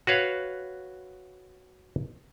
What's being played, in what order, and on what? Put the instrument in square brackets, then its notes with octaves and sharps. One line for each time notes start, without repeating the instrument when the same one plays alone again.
[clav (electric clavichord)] F#4 B4 C#5 F5